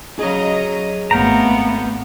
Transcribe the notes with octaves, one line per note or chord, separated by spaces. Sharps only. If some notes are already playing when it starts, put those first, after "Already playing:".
F#3 G#4 C#5 D#5 A#5
G#1 A3 B3 F5 G5 A#5